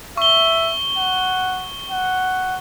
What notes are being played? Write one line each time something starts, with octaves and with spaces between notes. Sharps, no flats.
E5 C#6 G7
F#5
F#5